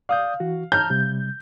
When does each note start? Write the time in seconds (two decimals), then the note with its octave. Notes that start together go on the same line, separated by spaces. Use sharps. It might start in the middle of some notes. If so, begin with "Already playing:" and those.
0.09 D5 F5 D#6 G6
0.40 E3 F#4
0.72 A5 A#5 F6 G6
0.90 C3 G3